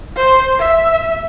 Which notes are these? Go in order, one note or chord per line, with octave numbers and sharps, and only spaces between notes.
C5
E5